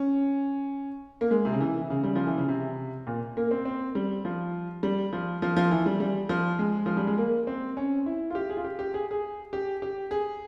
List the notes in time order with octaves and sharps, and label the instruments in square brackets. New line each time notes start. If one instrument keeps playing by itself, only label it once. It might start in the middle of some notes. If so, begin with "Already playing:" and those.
Already playing: [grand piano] C#4
A#3
G#3
C3
C#3
E3
E3
C#3
G3
F3
E3
C#3
C3
A#2
A#3
C4
C4
G3
F3
G3
F3
F3
F3
E3
G3
G3
F3
G#3
F3
G3
G#3
A#3
C4
C#4
E4
F4
G4
G#4
F4
G4
G4
G#4
G#4
G4
G4
G#4